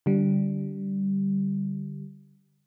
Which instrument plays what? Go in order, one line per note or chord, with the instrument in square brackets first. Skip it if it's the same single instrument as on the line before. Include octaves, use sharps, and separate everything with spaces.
[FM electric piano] D3 G3